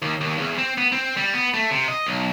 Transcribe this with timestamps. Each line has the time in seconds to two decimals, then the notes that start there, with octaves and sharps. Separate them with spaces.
0.02 D#2
0.21 D#2
0.38 E2
0.58 C4
0.78 B3
0.92 C4
1.17 G3
1.34 B3
1.54 A3
1.71 C3
1.88 D#5
2.06 B1